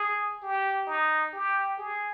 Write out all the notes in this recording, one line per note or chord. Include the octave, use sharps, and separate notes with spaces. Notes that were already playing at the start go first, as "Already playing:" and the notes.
Already playing: G#4
G4
D#4
G4
G#4